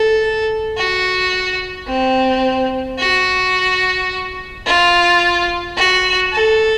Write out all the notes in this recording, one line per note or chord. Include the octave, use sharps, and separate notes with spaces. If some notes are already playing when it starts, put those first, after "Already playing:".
Already playing: A4
F#4
C4
F#4
F4
F#4
A4